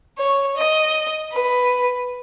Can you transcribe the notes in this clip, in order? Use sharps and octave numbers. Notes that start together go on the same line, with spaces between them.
C#5
D#5
B4